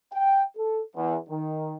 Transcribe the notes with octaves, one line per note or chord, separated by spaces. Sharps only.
G5
A4
E2
D#3